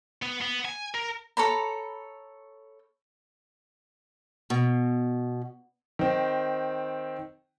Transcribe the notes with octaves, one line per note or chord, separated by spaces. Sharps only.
B3
B3
G#5
A#4
A4 C#5 A#5 B5
B2
D#3 C4